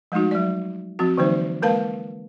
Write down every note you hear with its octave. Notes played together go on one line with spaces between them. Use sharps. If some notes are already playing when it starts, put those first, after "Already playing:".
F3 G#3 A3 D#4 F#4
F#3 D5
F3 C4 F#4
D3 E3 F#3 A#3 D#4 C5
G#3 A#3 A#4 B4 F5 A5